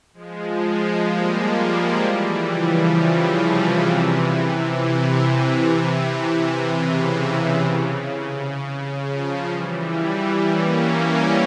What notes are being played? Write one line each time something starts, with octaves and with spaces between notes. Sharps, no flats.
F3 G#3
G3 A#3
F3 G#3
E3 G3
C#3 F3
C#3 F3
C3 E3
C3 E3
C#3
C#3 F3
E3 G3
A#3 C#4